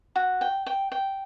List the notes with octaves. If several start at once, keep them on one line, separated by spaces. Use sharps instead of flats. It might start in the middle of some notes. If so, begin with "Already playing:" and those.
F#4
G5
G5
G5